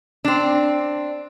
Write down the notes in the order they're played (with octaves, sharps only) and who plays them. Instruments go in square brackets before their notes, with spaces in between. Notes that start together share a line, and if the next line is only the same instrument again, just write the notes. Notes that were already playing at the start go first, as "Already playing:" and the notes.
[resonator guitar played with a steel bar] C4 D4